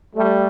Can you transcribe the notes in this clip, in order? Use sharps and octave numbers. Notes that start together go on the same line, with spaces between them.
G3 A3